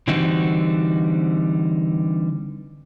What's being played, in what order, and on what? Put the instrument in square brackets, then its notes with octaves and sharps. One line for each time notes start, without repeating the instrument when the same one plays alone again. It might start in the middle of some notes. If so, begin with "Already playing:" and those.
[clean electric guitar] D3 E3 G3 C4 D#4 F#4